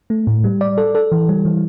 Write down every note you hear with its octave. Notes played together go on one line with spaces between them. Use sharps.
A3
A2
G3
D5
A4
A4
E3
G3
E3